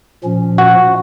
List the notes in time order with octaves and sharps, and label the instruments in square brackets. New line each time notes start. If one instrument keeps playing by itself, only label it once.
[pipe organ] A#2 F3 C#4
[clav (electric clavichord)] F#4